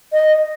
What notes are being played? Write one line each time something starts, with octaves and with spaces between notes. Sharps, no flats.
D#5